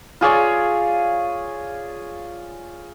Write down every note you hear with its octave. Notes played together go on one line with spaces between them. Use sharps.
F4 G#4 C#5 D5